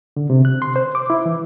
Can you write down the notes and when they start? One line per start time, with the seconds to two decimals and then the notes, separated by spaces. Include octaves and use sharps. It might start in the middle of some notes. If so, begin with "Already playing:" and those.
0.17 D3
0.30 C3
0.45 F#6
0.62 C6
0.76 C5
0.95 D6
1.10 E4
1.26 E3